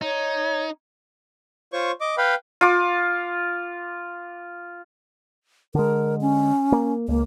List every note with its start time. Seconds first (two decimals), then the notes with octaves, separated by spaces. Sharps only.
0.01 D#4 C#5
1.73 F4 C5 C#5 C#6
2.01 D#5 D6
2.18 B4 F5 G5 B5
2.61 F4 D6
5.75 D3 G#3 A#4
6.21 C#4
6.72 A#3
7.08 C#2 A#3